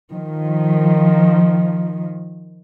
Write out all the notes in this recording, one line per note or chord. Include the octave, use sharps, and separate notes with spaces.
D#3 F3